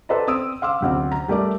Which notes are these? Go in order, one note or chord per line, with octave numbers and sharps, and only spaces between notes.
A4 B4 C5 D5 D#5 A#5
C4 D#6 E6 D7
F5 C6 D6 E6
F#1 D2 C4 D6
A#5
G3 A3 A#4 D5 D6